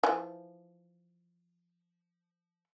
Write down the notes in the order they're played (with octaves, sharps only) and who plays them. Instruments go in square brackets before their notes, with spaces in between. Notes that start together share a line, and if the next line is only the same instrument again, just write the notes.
[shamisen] E3 F3